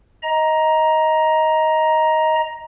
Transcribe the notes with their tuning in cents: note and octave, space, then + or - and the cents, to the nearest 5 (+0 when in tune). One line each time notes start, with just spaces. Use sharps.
D#5 +15 A#5 +10